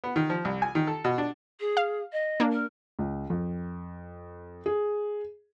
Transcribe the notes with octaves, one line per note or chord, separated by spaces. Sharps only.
B3
D#3
F3
C2
G#5
D#3
A4
B2
D4
G#4
F5
D#5
A#3 D4
A#4
C#2
F2
G#4